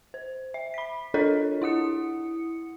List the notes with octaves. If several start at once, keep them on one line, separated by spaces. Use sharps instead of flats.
C5
E5
B5 B6
D4 F4 A4 A#4 C#5 D#5
E4 F#5 D#6 C#7